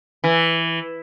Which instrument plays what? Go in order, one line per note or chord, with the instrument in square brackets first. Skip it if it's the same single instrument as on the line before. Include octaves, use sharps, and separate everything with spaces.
[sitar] E3